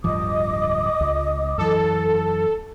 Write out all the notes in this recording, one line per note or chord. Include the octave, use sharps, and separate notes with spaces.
D1 G2 F3 D#5 D6 D#6
C#2
F#2 E3 A4